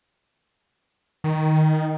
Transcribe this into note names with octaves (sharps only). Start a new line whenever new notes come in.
D#3